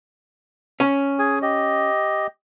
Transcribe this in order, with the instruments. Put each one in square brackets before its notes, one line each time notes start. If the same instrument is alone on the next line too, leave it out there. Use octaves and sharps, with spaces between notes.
[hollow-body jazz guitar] C#4
[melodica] G#4 G#5
G4 D#5